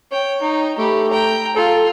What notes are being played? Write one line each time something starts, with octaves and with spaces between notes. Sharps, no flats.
C#5 G5
D#4
A3 G4 B5
G5 A#5
F4 A4